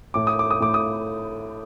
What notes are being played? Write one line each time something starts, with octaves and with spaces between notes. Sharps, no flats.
A2 D6
D#6
D6
D#6
A2 D6
D#6